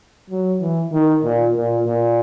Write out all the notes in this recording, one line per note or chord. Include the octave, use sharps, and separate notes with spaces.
F#3
E3
D#3
A#2
A#2
A#2